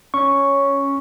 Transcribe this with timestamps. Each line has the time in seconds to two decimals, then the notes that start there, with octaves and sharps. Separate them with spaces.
0.14 C#4 C#6